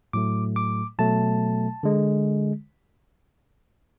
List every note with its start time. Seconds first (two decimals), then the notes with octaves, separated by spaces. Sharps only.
0.13 A2 F#3 A3 D6
0.56 D6
0.99 B2 F#3 A3 A5
1.83 D3 G#3